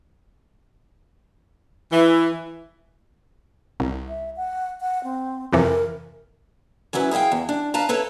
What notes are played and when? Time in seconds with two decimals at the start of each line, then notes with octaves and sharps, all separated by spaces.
1.92 E3
3.80 C2
4.08 E5
4.37 F#5
4.81 F#5
5.04 C4
5.53 F2 C3 E3 A#4
6.93 E3 F#3 C#4 E4 B4
7.11 E4 G#4 D#5 F5 G5
7.32 E2
7.49 D4
7.74 B4 F5 A5 A#5
7.89 E4 A4 B4 C#5